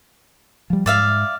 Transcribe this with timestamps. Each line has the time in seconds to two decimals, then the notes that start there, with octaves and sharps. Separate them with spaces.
0.70 F3 G3
0.86 G#2 D5 E5 F5